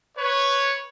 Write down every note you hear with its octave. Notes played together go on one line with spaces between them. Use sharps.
B4 C#5